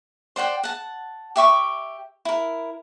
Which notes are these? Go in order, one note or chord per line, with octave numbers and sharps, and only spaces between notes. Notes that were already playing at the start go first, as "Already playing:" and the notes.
C5 D5 F#5 G5
F#5 A5
G4 E5 C#6 D6
E4 A#4